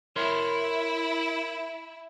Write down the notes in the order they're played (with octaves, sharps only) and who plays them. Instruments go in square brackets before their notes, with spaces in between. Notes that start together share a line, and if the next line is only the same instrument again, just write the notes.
[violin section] E4 [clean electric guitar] A#4 C#5 C6